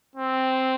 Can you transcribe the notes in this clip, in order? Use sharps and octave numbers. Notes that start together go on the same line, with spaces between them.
C4